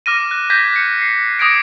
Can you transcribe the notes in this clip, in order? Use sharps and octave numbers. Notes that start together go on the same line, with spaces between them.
D6 F6 A#6 D#7
F#6
G6 G#6 A#6 B6
C#7
C7
D6 D#6 G#6 A#6 C7 D7